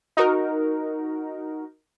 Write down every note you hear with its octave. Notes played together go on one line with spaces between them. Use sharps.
D#4 F#4 A#4